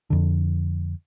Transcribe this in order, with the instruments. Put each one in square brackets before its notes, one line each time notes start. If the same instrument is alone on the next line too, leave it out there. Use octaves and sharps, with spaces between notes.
[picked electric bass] F2 D3